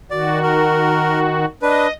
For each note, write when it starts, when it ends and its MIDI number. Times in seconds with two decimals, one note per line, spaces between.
0.11 1.45 51
0.11 1.45 66
0.11 0.39 74
0.43 1.19 70
1.62 1.87 62
1.62 1.87 71
1.62 1.93 75